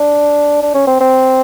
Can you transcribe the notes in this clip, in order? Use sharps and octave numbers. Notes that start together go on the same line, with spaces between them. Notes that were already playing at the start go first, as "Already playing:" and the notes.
Already playing: D4
D4
C#4
C4
C4